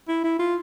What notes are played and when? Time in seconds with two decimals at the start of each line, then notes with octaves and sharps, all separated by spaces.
0.08 E4
0.24 E4
0.39 F4